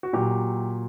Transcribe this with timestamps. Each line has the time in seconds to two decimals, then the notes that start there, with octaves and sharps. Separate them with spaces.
0.03 F#4
0.13 A#2 F#3 G4